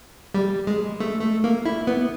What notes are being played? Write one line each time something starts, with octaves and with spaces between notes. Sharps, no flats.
G3
G#3
A3
A3
A#3
E4
B3